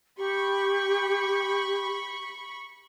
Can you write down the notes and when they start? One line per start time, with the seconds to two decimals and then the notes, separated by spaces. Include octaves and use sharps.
0.18 G4 B5 C#6